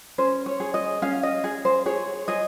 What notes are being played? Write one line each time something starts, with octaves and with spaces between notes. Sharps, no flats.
C#4 C5
C#5
G#4
D#5
C#4 F5
D#5
G#4
C5
G#4 C#5
G#4 D#5